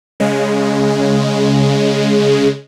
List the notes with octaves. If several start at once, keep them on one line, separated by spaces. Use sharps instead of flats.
C#3 G#3